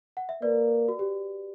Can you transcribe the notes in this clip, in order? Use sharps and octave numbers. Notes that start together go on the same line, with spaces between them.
F#5
E5
A#3 B4 D5
F#4
G4